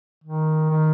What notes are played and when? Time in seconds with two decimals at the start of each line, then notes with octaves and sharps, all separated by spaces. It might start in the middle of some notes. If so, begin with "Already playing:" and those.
0.24 D#3
0.70 D#3